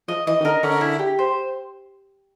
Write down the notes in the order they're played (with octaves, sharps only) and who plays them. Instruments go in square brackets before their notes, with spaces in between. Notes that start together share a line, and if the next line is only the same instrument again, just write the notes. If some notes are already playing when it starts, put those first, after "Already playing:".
[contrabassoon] F3 [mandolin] D#5
[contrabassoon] E3 [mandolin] D#5
[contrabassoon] D#3
[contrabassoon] D3 [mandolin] A#4
[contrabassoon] D3 [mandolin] C#4
[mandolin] E4
G4
C5